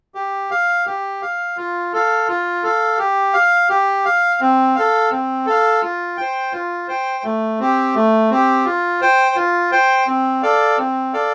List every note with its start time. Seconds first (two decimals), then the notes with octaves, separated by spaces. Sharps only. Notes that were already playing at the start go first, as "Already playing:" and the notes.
0.15 G4
0.51 F5
0.86 G4
1.22 F5
1.57 F4
1.93 A4 F5
2.28 F4
2.63 A4 F5
2.99 G4
3.33 F5
3.70 G4
4.05 F5
4.41 C4
4.75 A4 F5
5.11 C4
5.46 A4 F5
5.82 F4
6.17 C5 G5
6.52 F4
6.88 C5 G5
7.24 A3
7.60 C4 G4
7.95 A3
8.30 C4 G4
8.65 F4
9.01 C5 G5
9.36 F4
9.72 C5 G5
10.07 C4
10.42 A4 D5 F5
10.78 C4
11.13 A4 D5 F5